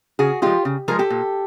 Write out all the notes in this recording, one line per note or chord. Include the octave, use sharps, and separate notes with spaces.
C#3 F#4 G#4
F3 G#3 F4 G4
C#3
F3 G#3 G#4 A#4
G4 A4
A#2